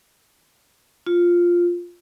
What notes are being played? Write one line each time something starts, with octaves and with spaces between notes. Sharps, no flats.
F4